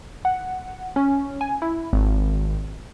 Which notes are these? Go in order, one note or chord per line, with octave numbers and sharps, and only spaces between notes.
F#5
C#4
G#5
E4
G#1